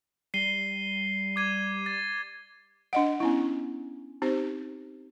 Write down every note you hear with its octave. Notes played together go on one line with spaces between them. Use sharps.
G3 C7 D#7 G7
D6 G#6 D#7
A6
D4 D#5 F#5
B3 C#4 E4
C4 D#4 G4 C5